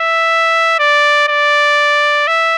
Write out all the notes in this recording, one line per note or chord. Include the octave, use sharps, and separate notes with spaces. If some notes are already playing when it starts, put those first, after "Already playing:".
Already playing: E5
D5
D5
E5